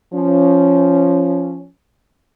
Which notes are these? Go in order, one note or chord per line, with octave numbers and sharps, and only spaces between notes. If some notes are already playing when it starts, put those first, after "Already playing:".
F3 C#4